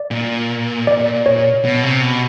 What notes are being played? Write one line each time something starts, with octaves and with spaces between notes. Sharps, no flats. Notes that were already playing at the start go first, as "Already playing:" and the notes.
Already playing: D5
A#2
D5
C#5
B2
C3
B2